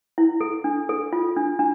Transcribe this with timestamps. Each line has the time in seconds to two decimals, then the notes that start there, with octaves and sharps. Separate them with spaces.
0.18 E4
0.41 A4
0.64 D4
0.89 A4
1.13 F4
1.37 D4
1.59 D4